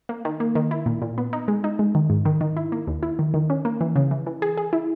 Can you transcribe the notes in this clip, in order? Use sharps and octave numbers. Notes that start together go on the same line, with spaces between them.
A#3
D#3
A#3
D#3
E4
A#2
A#2
B3
D#4
G#3
D#4
G#3
D#3
G#2
D#3
D#3
E4
A#3
D#2
E4
D#3
D#3
C#4
A#3
E3
C#3
E3
E3
G#4
G#4
E4